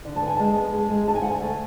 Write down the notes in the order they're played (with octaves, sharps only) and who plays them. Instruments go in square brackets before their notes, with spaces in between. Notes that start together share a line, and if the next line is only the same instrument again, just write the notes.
[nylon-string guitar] D3
A5
B3 G#5
G#3 A5
B3
G#3
G#3
D2 A5
G#5
D2 F#5
G#5
A3